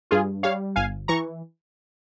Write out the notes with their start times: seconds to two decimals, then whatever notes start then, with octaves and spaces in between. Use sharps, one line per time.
0.11 G2 F4 G#4
0.43 G3 C#5 F5
0.76 G1 F5 G#5
1.08 E3 A#5 C#6